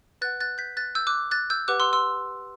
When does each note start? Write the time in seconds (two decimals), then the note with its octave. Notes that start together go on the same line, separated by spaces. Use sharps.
0.22 B4 F#5 F#6 A6
0.40 F#6 A6
0.58 G6 B6
0.77 F#6 A6
0.95 E6 G6
1.07 D6 F#6
1.31 F#6 A6
1.50 E6 G6
1.68 G4 B4 F#5 D6 F#6
1.80 C6 E6
1.93 C6 E6